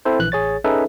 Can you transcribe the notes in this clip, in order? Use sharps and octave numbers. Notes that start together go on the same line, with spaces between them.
C4 E4 A4 C5
A#1 E3 F#6
A1 G#4 C#5 A6
C#4 D#4 G#4 A4 B4 E5